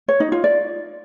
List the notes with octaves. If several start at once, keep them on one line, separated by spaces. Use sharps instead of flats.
C#5
D#4
F4
D5